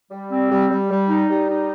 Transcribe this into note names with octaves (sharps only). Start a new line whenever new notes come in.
G3
C4
G3
G3
G3
D#4
G3
D#4